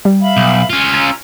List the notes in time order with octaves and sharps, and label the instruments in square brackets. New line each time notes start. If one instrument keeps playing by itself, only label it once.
[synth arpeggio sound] G3
[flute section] E5 F5 B5
[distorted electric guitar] B1
C#4 F4
[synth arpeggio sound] G#5 [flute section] A#5 E6 F#6